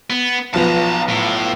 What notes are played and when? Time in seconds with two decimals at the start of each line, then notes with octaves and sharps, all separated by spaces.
0.10 B3
0.54 B1 F3 B3 A5 A#5
1.09 A2